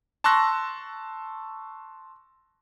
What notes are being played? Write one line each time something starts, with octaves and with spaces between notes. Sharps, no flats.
A5 C6 C#6 E6 F#6 A#6